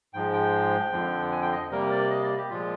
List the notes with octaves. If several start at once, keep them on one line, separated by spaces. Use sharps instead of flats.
G#2 F3 G#3 G5
G5
F2 D3 F3
G#5
G5
D#5
C3 G3 A#3 A#4
D5
D#5
D5
G4
A#2 F3 G#3 F4